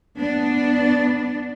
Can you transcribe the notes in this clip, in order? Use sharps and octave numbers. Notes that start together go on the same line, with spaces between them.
B3 D4